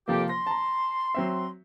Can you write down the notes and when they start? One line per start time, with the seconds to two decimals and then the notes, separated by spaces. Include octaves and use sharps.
0.08 F2 C3 F3 A#3 G4
0.29 C6 A#6
0.47 A5 A#5
1.15 F#3 C4 E5